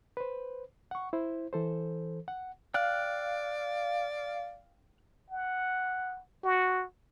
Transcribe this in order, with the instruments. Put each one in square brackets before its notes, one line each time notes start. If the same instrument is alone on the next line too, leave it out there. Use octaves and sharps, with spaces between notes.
[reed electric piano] B4 C5
F#5 C#6
E4 C5
E3 A4 C5
F#5
[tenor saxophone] D5 [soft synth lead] F5 [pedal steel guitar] G5 F6 F#6
[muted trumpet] F#5
F#4